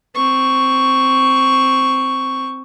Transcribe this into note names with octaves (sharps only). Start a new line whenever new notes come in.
C4 C#6